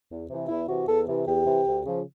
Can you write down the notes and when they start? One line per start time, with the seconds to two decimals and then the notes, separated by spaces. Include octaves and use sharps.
0.09 E2
0.29 C3 E3
0.48 E2 E4
0.67 C3 E3 F#4
0.86 E2 A4
1.07 C3 E3
1.25 E2 G4
1.45 C3 E3
1.64 D2
1.84 C#3 F3